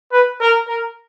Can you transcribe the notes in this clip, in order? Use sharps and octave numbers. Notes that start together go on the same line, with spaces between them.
B4
A#4
A#4